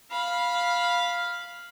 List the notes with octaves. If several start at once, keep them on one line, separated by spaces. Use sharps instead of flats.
F5 B5